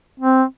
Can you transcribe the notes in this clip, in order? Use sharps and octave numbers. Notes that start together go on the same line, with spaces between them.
C4